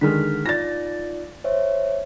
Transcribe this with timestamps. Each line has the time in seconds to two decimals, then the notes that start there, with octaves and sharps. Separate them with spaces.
0.01 D3 D#3 G#3 F6 B6
0.46 D#4 F4 D5 A6 A#6
1.44 C5 C#5 E5